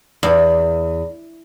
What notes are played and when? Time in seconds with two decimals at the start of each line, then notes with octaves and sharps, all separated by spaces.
0.23 E2